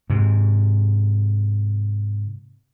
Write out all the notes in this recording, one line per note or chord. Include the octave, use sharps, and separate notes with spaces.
G#2 C3